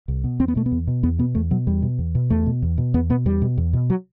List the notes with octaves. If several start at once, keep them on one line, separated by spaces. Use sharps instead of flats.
C2
B2
E2 C4
B3
B2 A3
B3
E2
B2
E2 B3
B2 B3
E2 A3
B2 F#3
E2 G3
B2
E2
B2
E2 A3
B2
E2
B2
E2 B3
B2 B3
E2 G3
B2
E2
B2
F#3